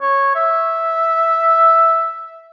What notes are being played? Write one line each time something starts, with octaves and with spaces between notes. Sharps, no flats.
C#5
E5